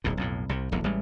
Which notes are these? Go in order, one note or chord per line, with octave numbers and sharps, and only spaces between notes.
D1 B1 A2
B1 F2 A2
C2 C3
D#1 A#1 E2
A1 G3 G#3